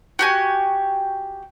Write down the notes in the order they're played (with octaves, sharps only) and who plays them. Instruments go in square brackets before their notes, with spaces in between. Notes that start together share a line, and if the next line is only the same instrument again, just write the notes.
[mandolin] F#4 G4 G#5